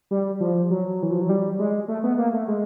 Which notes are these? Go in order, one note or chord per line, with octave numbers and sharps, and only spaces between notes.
G3
F3
F#3
E3
F3
F#3
G3
G#3
A3
B3
A#3
A3
G#3